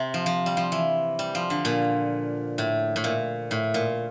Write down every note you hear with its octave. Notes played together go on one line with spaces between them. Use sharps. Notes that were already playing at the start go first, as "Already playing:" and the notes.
Already playing: C3
F3
F3
G3
F3
E3
G3
F3
D3
A#2
A2
A2
A#2
A2
A#2